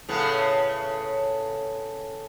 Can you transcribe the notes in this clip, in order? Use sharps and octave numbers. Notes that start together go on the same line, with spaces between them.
A2 C#3 B3